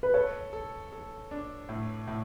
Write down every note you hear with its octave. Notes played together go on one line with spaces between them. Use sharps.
B4
A4 C#5
A4
A4
D4
A2
A2